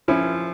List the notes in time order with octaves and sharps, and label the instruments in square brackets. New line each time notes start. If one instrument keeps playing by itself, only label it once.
[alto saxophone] F3 [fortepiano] C#4 E4